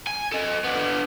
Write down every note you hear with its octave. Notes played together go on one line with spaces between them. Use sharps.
G#5
A4 D#5
B3 D4